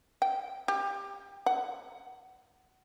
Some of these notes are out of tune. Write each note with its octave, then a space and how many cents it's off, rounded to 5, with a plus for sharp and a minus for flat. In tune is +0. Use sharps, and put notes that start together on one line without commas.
G5 -25
G4 +25
F#5 +25